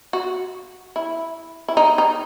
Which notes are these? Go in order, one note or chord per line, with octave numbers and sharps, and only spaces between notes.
F#4
E4
E4
D#4
D#4